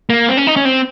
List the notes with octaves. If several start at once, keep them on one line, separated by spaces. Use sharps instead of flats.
A#3
C4
C#4
D#4
C#4
C4